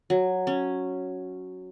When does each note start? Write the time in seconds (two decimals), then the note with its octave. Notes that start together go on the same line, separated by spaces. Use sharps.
0.10 F#3
0.47 C#4